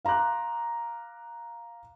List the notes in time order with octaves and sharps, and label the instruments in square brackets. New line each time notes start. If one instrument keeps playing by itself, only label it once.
[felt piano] F5 A#5 C6 D6 F#6